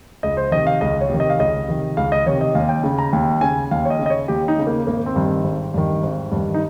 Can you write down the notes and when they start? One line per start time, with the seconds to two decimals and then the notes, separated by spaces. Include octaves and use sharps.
0.23 C#2 D#5
0.37 C5
0.51 C3 D#3 D#5
0.67 F5
0.81 C#2 D#5
1.01 C#5
1.09 C3 D#3
1.20 D#5
1.30 F5
1.39 C#2 D#5
1.68 C3 D#3
1.97 C#2 F5
2.12 D#5
2.26 C3 D#3 C#5
2.41 D#5
2.55 D#2 F5
2.69 G5
2.84 C#3
2.98 A#5
3.13 D#2
3.41 C#3 G#5
3.71 D#2 F5
3.85 C#5
3.90 D#5
3.99 C#3
4.06 D#5
4.10 C#5
4.28 D#2 G4
4.48 D#4
4.58 C#3
4.67 A#3
4.87 G#1 A#3
5.06 C4
5.16 G2 D#3
5.25 C4
5.44 G#1
5.74 G2 D#3
6.03 G#1
6.32 G2 D#3
6.54 D#4